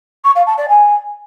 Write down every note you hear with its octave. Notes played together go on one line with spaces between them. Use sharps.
C#6
F5
A5
D5
G#5